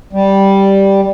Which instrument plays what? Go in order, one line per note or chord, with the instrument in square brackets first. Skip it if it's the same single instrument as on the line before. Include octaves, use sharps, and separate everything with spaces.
[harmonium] G3